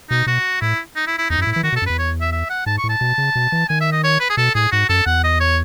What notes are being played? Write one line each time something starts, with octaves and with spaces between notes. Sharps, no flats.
B2 D#4
B2 F#4
A2 E4
D#4
E4
E4
E2 D#4
F#2
E4
A2
E3 E4
D#3 F#4
B2
A4
F#2
E2 B4
C#5
E5
E5
F#5
G#2 A5
C#6
A2
A5
B2
C#3
B2
E3
D#3 G#5
E5
D#5
C#5
B4
G#4
B2 A4
A2 G#4
G#2 F#4
F#2 A4
E2 F#5
D#5
C#5